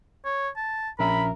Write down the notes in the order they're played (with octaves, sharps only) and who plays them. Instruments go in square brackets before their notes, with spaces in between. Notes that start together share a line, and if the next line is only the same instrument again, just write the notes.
[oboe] C#5
A5
[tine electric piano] A#1 C#4 E5 [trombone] A#4 [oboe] B5